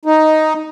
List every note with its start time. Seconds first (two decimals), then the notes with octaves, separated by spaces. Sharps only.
0.05 D#4